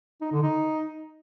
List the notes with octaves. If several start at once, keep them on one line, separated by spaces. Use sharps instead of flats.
D#4
D3
D#4